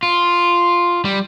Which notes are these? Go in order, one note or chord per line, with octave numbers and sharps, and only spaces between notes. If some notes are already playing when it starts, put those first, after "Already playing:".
F4
G3